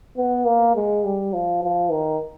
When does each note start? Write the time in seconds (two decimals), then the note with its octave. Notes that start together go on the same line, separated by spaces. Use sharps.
0.17 B3
0.46 A#3
0.76 G#3
1.05 G3
1.33 F3
1.63 F3
1.91 D#3